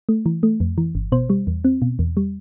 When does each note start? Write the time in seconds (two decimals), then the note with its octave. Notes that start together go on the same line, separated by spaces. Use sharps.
0.09 A3
0.26 E3
0.43 A3
0.60 F2
0.78 E3
0.95 G1
1.12 B2 C5
1.30 G3
1.47 E2
1.64 C4
1.82 B2
1.99 E2
2.17 G3